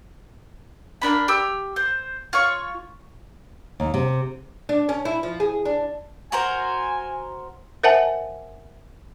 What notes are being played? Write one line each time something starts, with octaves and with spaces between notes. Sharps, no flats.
A#3 B3 D4 B5
G4 E6
C5
F4 C#5 C#6
D#2
C3
D4
C#4
E4
F3
G#4
D4
F#4 A#4 C5 G#5
A#4 C5 E5 F#5 G#5 A5